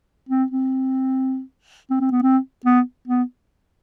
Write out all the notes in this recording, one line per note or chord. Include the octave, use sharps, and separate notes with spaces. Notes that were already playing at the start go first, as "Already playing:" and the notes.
C4
C4
C4
C4
B3
C4
B3
B3